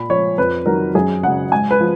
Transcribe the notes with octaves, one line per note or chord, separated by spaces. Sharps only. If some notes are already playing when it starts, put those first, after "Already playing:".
Already playing: A#2 B5
F3 C#5
F2 B4
D#3 F#3 A#4
F#2 G#4
C#3 F#3 F#5
G#2 G#5
B4
F3